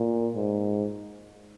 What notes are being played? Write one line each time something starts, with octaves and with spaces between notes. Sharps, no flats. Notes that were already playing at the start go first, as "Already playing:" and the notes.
Already playing: A#2
G#2